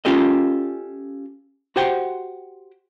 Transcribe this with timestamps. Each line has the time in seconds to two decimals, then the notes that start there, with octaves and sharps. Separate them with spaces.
0.05 C#4 F4 G4 A4 D#5
1.76 F#4 G4 C5 F#5 G5